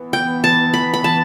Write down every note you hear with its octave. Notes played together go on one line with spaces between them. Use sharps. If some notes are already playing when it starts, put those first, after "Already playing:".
Already playing: E3 B3
G5
A5
B5
B5
A5